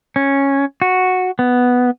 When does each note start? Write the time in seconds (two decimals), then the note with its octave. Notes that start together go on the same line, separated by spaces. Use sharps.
0.16 C#4
0.82 F#4
1.39 B3